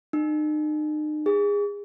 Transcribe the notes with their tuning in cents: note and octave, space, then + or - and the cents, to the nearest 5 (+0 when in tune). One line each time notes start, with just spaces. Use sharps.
D#4 -40
G#4 -25